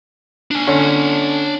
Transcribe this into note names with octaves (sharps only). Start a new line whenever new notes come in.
D4 G#5
D3 C#4